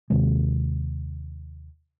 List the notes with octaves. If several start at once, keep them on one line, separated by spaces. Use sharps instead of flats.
D#2 C3 D#3 G#3